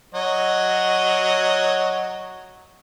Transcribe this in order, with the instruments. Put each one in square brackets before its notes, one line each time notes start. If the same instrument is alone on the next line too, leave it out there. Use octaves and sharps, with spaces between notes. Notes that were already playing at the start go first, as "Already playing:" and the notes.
[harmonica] F#3 C#5 D#5